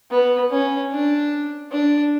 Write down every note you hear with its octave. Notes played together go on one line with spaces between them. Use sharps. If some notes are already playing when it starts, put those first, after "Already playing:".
B3
C#4
D4
D4